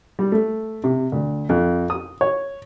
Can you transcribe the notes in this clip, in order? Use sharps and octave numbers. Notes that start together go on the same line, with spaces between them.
G3
A3
C3
D2
F2
D#6
C#5